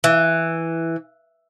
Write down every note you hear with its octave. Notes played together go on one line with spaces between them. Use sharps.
E3